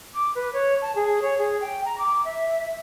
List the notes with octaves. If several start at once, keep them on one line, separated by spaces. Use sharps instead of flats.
D6
B4
C#5
A5
G#4
C#5
G#4
G5
A#5
D6
E5